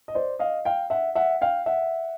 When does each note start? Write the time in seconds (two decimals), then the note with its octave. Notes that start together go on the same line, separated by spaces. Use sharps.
0.08 D#5
0.14 C5 D5
0.39 D#5 F5
0.65 F5 G5
0.90 E5 F#5
1.15 E5 F#5
1.41 F5 G5
1.66 E5 F#5